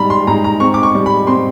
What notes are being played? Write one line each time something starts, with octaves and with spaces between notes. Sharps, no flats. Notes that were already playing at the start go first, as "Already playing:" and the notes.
Already playing: G#2 G3 A#5 B5
C6
G#2 A#5
A#5
C4 C#6
D6
C#6
G3
B5
C4 C6